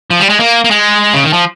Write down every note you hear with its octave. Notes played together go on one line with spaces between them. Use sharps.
F3
G3
G#3
A#3
A#3
G#3
C#3
D#3
F3